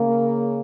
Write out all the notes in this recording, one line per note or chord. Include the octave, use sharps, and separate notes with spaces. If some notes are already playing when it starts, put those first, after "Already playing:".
Already playing: C#3 A#3